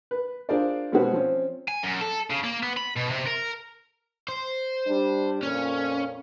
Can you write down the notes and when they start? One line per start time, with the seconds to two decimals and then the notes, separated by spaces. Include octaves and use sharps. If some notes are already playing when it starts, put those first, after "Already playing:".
0.11 B4
0.49 D4 F4 G#4 A#4 C5 D5
0.92 B2 G#3 C4 C#4 F#4 B4
1.13 F3 C4 C#4
1.68 G#5
1.83 F#2
2.01 A4
2.30 C#3
2.44 A#3
2.63 B3
2.77 B5
2.96 B2
3.10 C3
3.26 A#4
4.28 C5
4.86 G3 D4
5.43 F2 A#2 C#4